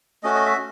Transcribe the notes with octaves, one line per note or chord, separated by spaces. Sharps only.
A3 C#4 F#4 D#5
D#5
E5